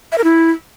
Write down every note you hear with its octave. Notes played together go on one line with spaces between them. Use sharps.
E5
A#4
E4